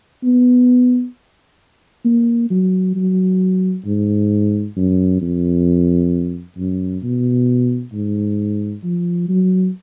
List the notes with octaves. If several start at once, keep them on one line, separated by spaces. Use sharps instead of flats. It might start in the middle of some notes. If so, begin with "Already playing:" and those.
B3
A#3
F#3
F#3
G#2
F#2
F2
F#2
B2
G#2
F3
F#3